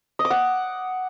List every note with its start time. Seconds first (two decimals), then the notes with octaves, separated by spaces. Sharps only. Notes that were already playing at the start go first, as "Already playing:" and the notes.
0.19 D#5
0.25 D6
0.30 F#5